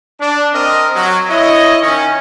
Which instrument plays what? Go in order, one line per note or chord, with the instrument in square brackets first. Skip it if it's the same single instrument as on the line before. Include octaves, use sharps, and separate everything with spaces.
[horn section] D4
C4 A#4 D#5
F#3
E4 C#5 D#5
D#3 C#4